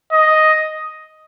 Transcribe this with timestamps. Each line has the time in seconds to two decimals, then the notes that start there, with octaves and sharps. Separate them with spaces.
0.12 D#5